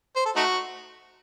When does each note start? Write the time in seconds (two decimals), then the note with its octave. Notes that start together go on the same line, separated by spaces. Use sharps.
0.16 C5
0.25 A4
0.36 A3 D#4 F#4